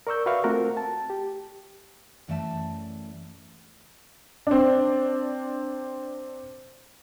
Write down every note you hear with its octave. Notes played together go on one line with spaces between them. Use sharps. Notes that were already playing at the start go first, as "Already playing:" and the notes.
A#4 D5 C#6 E6 G6
F#4 B4 D5 E5 F5 C#6
A3 C4 F4 F#4 A#4
A5
G4
F#2 E3 A3 D5 E5 A5
C4 D4